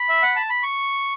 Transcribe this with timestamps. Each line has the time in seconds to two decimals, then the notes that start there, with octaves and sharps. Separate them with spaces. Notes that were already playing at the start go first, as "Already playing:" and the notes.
Already playing: B5
0.09 E5
0.22 F#5
0.36 A5
0.50 B5
0.63 C#6